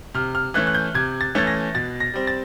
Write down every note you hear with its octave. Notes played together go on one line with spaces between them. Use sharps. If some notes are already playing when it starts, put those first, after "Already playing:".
C3 F6
F6
E3 A3 C#4 F#6
F#6
G6
C3 G#6
A6
E3 A3 C#4 A6
A#6
B2 A6
A#6
G3 C4
A6